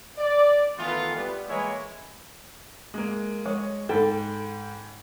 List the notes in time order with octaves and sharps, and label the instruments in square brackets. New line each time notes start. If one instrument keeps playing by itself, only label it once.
[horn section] D5
D#3 E3 A3 B3 F4
G3 B3
E3 G#3 A#3 E4 C#5
[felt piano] G#3 A#3
[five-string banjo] G#3 [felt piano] C#5
[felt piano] G#2 G5 B5 [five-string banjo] A4